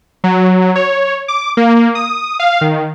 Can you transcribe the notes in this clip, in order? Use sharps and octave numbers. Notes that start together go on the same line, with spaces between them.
F#3
C#5
D6
A#3
D#6
F5
D#3